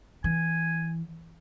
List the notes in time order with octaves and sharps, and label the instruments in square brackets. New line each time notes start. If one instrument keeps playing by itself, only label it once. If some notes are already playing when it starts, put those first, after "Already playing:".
[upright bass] E3 [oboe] G#5